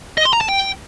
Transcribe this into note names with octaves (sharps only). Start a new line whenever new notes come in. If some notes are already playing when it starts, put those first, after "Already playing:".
D#5
C6
A#5
A5
G5